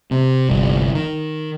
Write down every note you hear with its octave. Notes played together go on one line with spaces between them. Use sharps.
C3
G1 C2
D#3